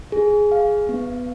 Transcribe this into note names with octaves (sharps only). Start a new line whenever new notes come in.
G#4
F5
B3